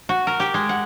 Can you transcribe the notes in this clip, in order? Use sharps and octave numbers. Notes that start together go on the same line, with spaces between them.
F#4
A#4
G4
G#3
F#5